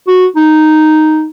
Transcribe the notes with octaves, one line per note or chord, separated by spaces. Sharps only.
F#4
D#4